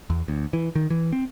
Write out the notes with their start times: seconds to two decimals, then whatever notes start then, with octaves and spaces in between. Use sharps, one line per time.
0.10 E2
0.28 D2
0.53 E3
0.75 D#3
0.90 E3
1.13 C4